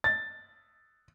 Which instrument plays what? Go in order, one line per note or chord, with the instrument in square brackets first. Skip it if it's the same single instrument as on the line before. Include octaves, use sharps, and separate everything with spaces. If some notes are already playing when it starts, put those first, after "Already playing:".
[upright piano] A6